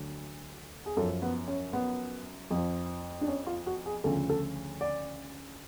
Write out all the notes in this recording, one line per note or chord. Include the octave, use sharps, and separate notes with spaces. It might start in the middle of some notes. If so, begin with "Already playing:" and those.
Already playing: D2 D3 F#3
G#4
F#2 F3 A4
B3
C#4
B3
F2 F3
D4
C#4
F4
F#4
G#4
D2 C#3 F3 A4
A4
D5